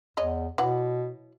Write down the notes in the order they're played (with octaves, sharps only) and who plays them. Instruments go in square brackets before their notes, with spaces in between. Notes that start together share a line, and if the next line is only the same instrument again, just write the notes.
[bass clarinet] E2 [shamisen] G#3 C#5 D#5
[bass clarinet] B2 [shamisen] E3 F#3 F#5